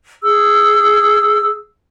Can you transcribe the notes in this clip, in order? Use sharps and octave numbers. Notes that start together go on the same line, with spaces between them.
G#4 E6